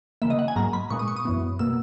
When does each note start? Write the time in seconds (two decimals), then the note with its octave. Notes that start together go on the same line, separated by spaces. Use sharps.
0.22 C#3 E3 A#3 E5
0.30 D#5
0.39 F#5
0.48 G#5
0.56 G#2 F#3 A#3 A#5
0.73 B5
0.90 A#2 G#3 B3 C#6
0.99 D#6
1.08 C#6
1.16 D#6
1.25 F#2 E3 B3
1.59 B2 A#3 E6